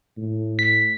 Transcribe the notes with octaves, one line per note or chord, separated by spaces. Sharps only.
A2
B6